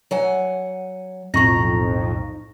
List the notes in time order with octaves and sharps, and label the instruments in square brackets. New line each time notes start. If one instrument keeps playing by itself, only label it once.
[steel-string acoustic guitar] F#3 F#5 G#5
[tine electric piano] B1 A2 [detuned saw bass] F2 [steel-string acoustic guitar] D#4 A#5 [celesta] C#6 A#6